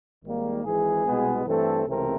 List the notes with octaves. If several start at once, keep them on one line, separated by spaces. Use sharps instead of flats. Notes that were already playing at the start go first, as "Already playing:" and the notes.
G#1 G#2 D#3 G3 A#3
G#1 G#2 E3 G#4
C2 B2 G#3 B3
G2 E3 A3 C4 A4
C#2 C3 E3 A3 C4 A#4